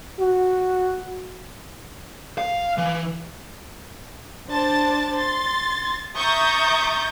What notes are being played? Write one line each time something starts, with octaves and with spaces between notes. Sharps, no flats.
F#4
F5
E3
D4 C5 A5 A6
C6 A6
E5 A#5 C#6 D#6 G6 A6